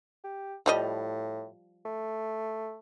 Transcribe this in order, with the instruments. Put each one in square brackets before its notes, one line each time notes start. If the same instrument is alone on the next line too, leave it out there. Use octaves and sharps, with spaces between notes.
[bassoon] G4
[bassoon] A2 [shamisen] F3 G3 D#5
[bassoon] A3